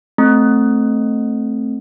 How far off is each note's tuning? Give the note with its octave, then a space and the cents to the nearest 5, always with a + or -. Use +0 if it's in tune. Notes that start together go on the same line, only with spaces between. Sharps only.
A3 +0 C4 +0